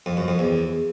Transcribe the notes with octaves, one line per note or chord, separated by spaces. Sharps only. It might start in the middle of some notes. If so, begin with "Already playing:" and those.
F2
F#2
F2
E2